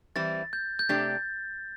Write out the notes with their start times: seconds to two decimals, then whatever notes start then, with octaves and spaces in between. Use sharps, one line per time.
0.15 E3 G3 C4 E4 A6
0.53 G6
0.79 G6
0.89 C3 A3 D4 G4 D5 A6